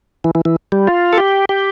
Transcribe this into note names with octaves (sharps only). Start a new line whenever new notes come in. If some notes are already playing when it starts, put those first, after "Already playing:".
E3
E3
E3
G3
F4
A4
G4
G4